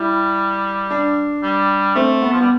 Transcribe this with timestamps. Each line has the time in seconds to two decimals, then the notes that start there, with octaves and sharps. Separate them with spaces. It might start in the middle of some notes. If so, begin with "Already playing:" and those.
Already playing: G3 E4
0.90 D4
1.43 G3
1.95 A3 C4
2.22 B3
2.33 F3
2.41 G3 B3